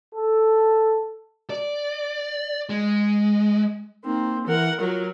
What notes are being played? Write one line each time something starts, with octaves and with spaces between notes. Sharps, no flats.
A4
D5
G#3
A#3 C4 D#4
E3 A#4 F#5
F#3 F4 A#4